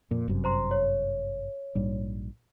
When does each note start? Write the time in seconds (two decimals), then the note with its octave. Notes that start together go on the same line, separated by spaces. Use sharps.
0.11 F2 A#2
0.28 G1 F#2 C3
0.44 C5 A#5 C6
0.71 C#5
1.75 A#1 G#2 G3